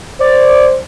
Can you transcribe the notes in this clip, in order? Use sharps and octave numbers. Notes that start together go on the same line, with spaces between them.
C5 D5